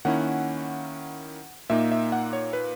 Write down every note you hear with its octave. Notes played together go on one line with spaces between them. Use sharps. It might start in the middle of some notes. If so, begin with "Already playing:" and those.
D#3 A#3 C#4 E4 F#5
A#2 A#3 D#4 E5
E5
F#5
C#5
B4